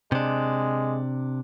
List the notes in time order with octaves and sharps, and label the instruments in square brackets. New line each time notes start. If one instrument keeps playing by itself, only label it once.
[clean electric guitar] C3 D4 [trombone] G#3